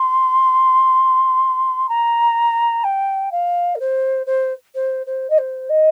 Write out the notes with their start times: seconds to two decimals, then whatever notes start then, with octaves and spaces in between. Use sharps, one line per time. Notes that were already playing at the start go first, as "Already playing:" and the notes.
Already playing: C6
1.89 A#5
2.84 G5
3.31 F5
3.75 A#4
3.80 C5
4.26 C5
4.74 C5
5.06 C5
5.30 D#5
5.38 C5
5.69 D#5